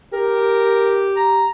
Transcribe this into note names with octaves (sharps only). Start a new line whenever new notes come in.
G4 A#4
A#5